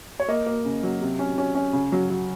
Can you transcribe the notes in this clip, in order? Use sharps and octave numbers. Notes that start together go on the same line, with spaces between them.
C#5
A#3 D#5
A#3
C#3
F#3
C3
C#4
C#4
C#4
C#3
F#3
F#3